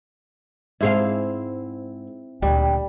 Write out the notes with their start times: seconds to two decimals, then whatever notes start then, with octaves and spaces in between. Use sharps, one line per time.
0.81 G#2 C4 E4 G#4 F5
2.42 D2 A#2 G3 G5